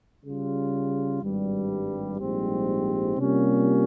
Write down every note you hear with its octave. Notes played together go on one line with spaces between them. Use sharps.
C#3 G3 C#4 F4 G#4
G#1 G2 G3
A#1 G#2 G3 C4 G4
C3 G3 A#3 C#4 F4